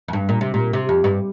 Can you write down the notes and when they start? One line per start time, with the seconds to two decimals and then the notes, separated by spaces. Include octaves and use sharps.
0.08 F2
0.13 G2
0.29 A#2
0.41 C3
0.54 A#2
0.73 C3
0.89 F2
1.04 G2